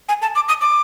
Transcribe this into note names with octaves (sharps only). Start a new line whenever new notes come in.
G#5
A5
D6
D#6
D6